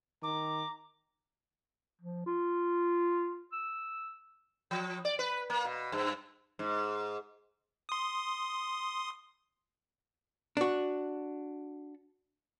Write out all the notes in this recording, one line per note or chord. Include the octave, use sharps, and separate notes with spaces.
D#3 A#5 D6
F3
F4
E6
F3
D5
B4
A#3
B2
G2
G#2
C6 D#6
D4 F#4